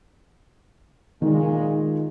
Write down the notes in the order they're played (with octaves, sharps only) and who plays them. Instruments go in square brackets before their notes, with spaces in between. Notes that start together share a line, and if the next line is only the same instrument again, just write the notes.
[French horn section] A#2 G#3 [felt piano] D#3